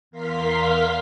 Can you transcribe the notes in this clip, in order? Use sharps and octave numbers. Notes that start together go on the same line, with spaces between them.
E2 A#4 F5 C6 B6